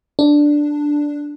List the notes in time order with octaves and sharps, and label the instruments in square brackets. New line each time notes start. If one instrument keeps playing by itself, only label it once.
[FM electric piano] D4